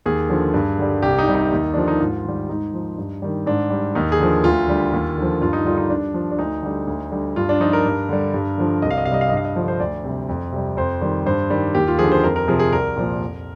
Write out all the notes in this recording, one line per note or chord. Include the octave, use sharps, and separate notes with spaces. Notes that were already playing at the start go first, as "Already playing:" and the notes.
D#2 G#4
D3 F3
G2
D3 G3
C2 G4
D#4
C3 G3
D#4
D#2
D3 F3 D4
D#4
G#2 F4
D#3 G3
G#2 D#4
F3
G2
D#3 G3
G#2 D4
G3
D#2 D#4
G#4
D3 F3
D2 F4
D3 G3
D#2
D3 F3
G2 F4
D#4
D3 G3 F4
D#4
G2 D4
F3
D4
D2 D#4
D3 G3
D2
D3 G3
G2 F4
D4
F3 D#4
A#4
G2
D3 G3
G2
D3 F3
C2 D#5
F5
D#5
C3 F5
G3 D#5
F5
G2 D#5
F5
D#5
D3 F3
C5
D2 D5
C3 G3
F2
C3 G3
F2 C5
D#3 G3
G2 C5
D#3 G3
D#2 G4
F4
D3 F3 G#4
C5
F2 A#4
A#4
C3 F3 G#4
G#4
C2 A#4
A#2 F3
F2